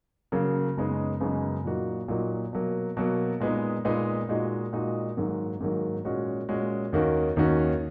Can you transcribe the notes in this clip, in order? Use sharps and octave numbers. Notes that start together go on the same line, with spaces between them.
C#3 F#3 A#3
F#2 C#3 G#3 B3 D#4
F#2 C#3 G#3 B3 D#4
A#2 F#3 A#3 D#4 F#4
A#2 F#3 A#3 D#4 F#4
B2 F#3 A#3
B2 F#3 A#3
A#2 G#3 B3 D#4
A#2 G#3 B3 D#4
A#2 G#3 D#4 F#4
A#2 G#3 D#4 F#4
G#2 D#3 F#3 A#3
G#2 D#3 F#3 A#3
A#2 G#3 C#4 F#4
A#2 G#3 C#4 F#4
D#2 D#3 A#3 C#4 F#4
D#2 D#3 A#3 C#4 F#4